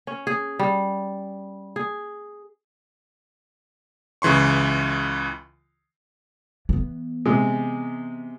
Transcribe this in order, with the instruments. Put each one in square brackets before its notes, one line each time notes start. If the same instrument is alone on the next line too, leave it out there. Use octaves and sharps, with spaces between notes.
[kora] C#4
G#4
G3
G#4
[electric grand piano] C#2 C#3 E3 C6 C#6
[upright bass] E3 B3
[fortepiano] C3 G#3